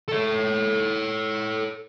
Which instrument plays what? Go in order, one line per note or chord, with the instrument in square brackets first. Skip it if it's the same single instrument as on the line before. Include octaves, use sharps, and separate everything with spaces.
[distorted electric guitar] A4 C#5